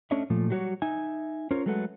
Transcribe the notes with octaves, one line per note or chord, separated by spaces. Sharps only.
A3 C#4 D4 C#5 D#5 E5
A#2 F3 A3
F#3 G3 F#4 C5 C#5
D#4 E5 G#5
C#4 F4 A#4 C5 C#5
F#3 G#3 A3 A4 B4 F#5